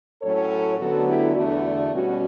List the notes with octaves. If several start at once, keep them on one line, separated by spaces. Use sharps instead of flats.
A2 F#3 C#4 A4 C#5
D2 D3 F#3 B3 F#4 A4
E4 G4
E2 D3 A3 D4 F#4
B2 G3 C#4 F#4